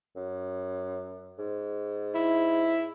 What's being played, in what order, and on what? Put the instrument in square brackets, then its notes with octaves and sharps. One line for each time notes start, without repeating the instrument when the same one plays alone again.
[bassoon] F#2
G#2
[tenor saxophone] E4